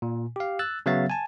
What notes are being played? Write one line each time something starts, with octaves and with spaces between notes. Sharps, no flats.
A#2
G4 F5
E6 F#6 A6
C#3 F#3 B3 E5 F5 A6
G#5 A5